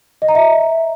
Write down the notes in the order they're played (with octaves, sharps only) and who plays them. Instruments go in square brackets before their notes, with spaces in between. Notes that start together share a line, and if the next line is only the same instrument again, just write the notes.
[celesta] D#5
A#5
E5